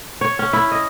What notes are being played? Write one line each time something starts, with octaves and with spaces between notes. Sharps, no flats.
C#5
C#4
E4
D#5